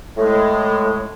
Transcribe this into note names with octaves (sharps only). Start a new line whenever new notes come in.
A2 G#3